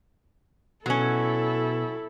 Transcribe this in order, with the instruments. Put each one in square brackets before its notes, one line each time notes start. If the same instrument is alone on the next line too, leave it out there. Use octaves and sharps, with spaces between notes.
[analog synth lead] B2 [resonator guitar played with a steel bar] F#3 C#4 [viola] E4 A4